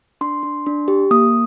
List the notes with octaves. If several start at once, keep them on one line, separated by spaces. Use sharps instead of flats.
D4 C6
D4
D4
G4
A#3 D#6